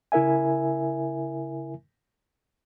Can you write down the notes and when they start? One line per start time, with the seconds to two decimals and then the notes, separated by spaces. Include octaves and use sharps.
0.12 C#3 E4 A#4 E5 G#5